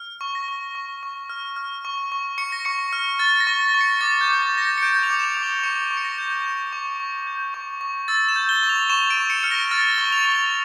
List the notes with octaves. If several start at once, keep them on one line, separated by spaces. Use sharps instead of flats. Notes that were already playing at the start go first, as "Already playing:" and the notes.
Already playing: F6
C#6
A#6
C#6
C#6
C#6
F6
F6
C#6
C#6
C#6 C#7
A#6
C#6 C#7
F6
F6 A6
A#6
C#6
A#6
C#6
C#7
D6 A6
G6
D6
A6
G6 A#6
C#7
C#7
G6 D7
F7
D6
E7
F7
D6
G7
C#6 C#7
C#6
C#7
A#6
G6
G6
C#6
C#6
G6
C#6
C#6
E6 A6
E7
G6
G7
C#6
F7
C#6 E7
D7
C#6
C#7
F6 C#7
A#6
F6 A6
G7
C#6
F7
C#6
F7